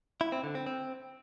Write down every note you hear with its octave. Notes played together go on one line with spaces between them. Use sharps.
E4
C4
D3
C4
C4